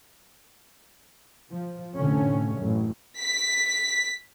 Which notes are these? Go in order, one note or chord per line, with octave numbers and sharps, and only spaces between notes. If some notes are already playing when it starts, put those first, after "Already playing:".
F3
F1 A2 D3 C#4
A1 F#2
B6